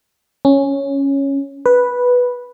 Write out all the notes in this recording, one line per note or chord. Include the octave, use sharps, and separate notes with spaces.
C#4
B4